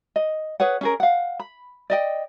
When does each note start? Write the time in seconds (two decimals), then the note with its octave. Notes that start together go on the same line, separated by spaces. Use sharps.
0.16 D#5
0.60 G#4 B4 C#5 F#5
0.81 C#4 G#4 A#4
1.00 F5 F#5
1.40 B5
1.90 D5 D#5 G5